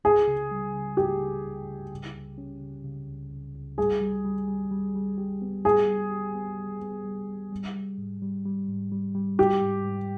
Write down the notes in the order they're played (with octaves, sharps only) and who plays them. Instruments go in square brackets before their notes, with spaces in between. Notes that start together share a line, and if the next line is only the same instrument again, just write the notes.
[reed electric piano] C#2 [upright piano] G#4
[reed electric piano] C#3
G3
C#3
[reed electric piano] C#2 [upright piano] G4
[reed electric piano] C#3
C#2
C#3
C#3
C#2
C#4
C#3
C#3
C#2
C#2
C#2
[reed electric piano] G3 [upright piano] G#4
[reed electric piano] G3
G3
G3
G3
G3
G4
B3
[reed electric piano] G4 [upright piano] G#4
[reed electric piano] G3
G4
B3
G3
B3
G3
G3
G3
G3
G#2
G3
G3
G#2
G3
G3
[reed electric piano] G3 [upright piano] G4
[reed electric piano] G#2
G#2